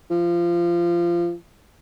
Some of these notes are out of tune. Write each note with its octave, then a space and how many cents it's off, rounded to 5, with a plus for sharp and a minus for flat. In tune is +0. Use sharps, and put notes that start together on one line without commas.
F3 -20